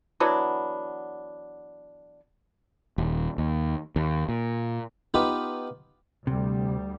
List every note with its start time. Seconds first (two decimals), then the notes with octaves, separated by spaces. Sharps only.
0.20 E3 F#3 B3 D4
2.98 D#1
3.38 D#2
3.96 D#2
4.29 A#2
5.14 B3 D#4 F4 G4 B4
6.27 D2 C3 G3